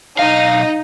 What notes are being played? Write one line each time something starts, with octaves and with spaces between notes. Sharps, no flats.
B1 D#4 F5